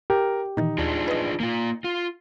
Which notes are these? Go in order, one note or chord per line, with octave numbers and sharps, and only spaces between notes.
G4 A#4
A#2 D#3 E3 D#4
D#2 D4 F4 G#4
B4 D#5
A#3 F4
F4